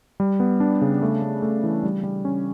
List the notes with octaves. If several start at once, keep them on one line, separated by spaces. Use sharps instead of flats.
G3
B3
D4
C#3
A3
A3
A3
E3
G3
G3
C#4